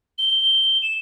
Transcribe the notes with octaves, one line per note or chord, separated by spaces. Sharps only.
G7
E7